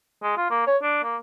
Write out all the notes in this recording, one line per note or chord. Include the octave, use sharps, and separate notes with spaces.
G#3
F4
A#3
C#5
D4
A#3